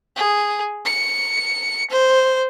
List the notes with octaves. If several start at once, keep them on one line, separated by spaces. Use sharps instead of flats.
G#4
C#7
C5